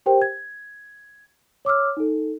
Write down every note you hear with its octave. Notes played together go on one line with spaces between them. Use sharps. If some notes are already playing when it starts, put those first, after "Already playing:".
G4 A#4 C5 G5
G#6
C#5 D6 E6 F6
D#4 A4